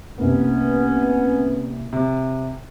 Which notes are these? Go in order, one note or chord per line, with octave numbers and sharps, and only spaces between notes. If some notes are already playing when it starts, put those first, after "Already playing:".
C2 A#3 B3 C#4
C3